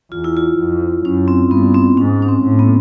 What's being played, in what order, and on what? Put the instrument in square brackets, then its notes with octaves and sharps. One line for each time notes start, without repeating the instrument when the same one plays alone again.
[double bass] E2 [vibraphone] F4
[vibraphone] E4
F4
[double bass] F2
[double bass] F#2 [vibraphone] C#4
[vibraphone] C4
[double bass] G2 [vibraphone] B3
[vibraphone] C4
[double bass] G#2 [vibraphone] C#4
[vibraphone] C#4
C4
[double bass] A2
[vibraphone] B3